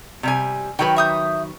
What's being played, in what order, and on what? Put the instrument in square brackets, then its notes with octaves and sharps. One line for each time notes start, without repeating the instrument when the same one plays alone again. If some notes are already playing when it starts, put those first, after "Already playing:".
[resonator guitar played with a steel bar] C3 G3 G#5
[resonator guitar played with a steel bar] D#3 F#3 B4 [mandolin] G5 B5
[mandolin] E5 D#6 G6